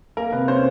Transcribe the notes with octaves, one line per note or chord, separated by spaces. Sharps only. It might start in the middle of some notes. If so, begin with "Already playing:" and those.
A#3 A#4
C3 B4
C#4 C5